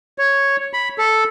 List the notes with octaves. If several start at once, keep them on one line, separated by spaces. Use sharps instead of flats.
C#5
B5
A4